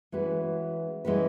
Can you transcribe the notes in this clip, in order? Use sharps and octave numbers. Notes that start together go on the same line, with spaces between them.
E3 G#3 C#4 F#4 B4
E3 G#3 C#4 F#4 B4